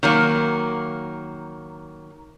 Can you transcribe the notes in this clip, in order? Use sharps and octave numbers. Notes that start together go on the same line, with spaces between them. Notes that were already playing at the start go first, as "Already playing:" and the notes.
D#3 F#3 A#3